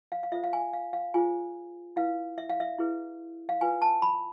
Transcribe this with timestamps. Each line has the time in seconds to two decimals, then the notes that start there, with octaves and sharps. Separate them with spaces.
0.12 F5
0.23 F5
0.32 F4 A4 C5 E5
0.44 F5
0.53 G#5
0.73 F5
0.93 F5
1.14 F4 G#4 C5 G#5
1.96 E4 B4 F5
2.38 E5
2.49 F5
2.60 E5
2.78 E4 G#4 B4
3.49 F5
3.61 F4 B4 G#5
3.82 A5
4.02 B5